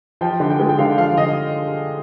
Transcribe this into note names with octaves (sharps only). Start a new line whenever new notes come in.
F3 G5
D3
G5
G#3
G5
D3 F5
F3 F5
D3 D#5